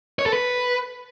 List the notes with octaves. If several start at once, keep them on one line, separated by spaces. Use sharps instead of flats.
C#5
A4
B4